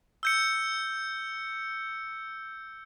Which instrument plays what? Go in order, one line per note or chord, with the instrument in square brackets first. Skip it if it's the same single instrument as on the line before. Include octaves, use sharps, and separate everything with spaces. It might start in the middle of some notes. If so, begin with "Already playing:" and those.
[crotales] E6 G6 C#7